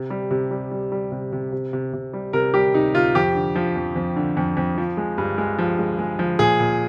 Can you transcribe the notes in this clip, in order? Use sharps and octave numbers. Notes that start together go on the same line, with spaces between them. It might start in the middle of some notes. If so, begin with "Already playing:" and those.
Already playing: C3
G3
C3
G3
G3
G3
C3
C3
C3
C3
C3
G3
C3 A#4
G3 G4
C3 D#4
C3 F4
F2 G4
D3
F3
F2
F2
D3
F2
F2
F3
G#3
G2
G#3
F3
G#3
G#3
F3
A#2 G#4
A#2